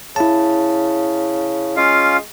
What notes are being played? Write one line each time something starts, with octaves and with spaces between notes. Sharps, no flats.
C#3 E4 A5
G#3 C#4 F4 F5